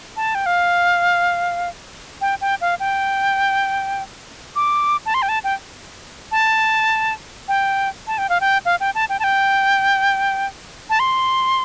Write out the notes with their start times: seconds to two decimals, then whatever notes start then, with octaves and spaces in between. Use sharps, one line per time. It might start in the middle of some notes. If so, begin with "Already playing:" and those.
0.17 A5
0.35 G5
0.46 F5
2.21 G5
2.41 G5
2.61 F5
2.80 G5
4.56 D6
5.06 A5
5.14 C6
5.22 G5
5.29 A5
5.44 G5
6.32 A5
7.48 G5
8.07 A5
8.18 G5
8.29 F5
8.41 G5
8.65 F5
8.80 G5
8.95 A5
9.09 G5
9.19 A5
9.24 G5
10.90 A5
11.00 C6